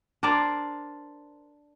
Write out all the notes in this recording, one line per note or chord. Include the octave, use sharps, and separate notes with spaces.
D4 A#4 C5 D5